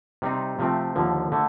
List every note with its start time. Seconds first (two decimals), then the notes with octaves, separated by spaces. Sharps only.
0.22 C3 G3 C4 D#4
0.59 C3 F3 A3 C4
0.96 D#2 D3 F3
1.32 D3 A3